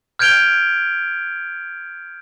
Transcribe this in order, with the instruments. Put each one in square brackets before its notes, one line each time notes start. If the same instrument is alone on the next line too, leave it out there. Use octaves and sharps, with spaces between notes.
[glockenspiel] F6 G6 G#6 D7 F7 G7